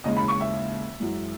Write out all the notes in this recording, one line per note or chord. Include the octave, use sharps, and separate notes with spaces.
D#2 C#3 E3 G#3 D#5
B5
C#6
E5
F#2 E3 G#3